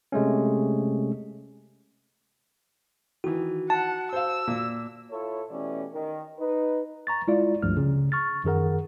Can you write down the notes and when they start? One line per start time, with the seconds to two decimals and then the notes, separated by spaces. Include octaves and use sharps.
0.12 C3 G#3 A3 C#4
3.24 D#3 E3 F#4
3.70 F#5 A5
4.13 C5 F5 E6
4.47 A#2
5.11 E4 F4 A4 C#5
5.50 B2 E3 A3 C#4 G4 D5
5.93 D#3
6.39 D#4 B4
7.07 A#5 C#6 A6
7.28 G#3 E4 F4 D5
7.62 C#2 G2 F3 A3 F6
7.77 C#3
8.12 C#6 F6 A6
8.44 F#2 D#3 G#4 A#4 F#5